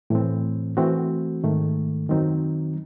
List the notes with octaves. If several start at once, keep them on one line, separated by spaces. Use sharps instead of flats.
A2 E3 C4
E3 A3 C4 F#4
G#2 D#3 A3
F#2 D#3 F#3 C4 D#4